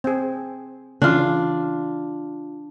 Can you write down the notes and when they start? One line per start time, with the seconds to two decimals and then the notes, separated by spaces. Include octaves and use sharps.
0.04 C4 G#4
1.02 C#3 E3 D4 F4